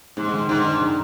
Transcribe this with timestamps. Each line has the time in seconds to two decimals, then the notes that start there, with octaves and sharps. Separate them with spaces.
0.17 G#2 G#3
0.33 D#3
0.48 G#2 D#3
0.64 D4
0.81 D#3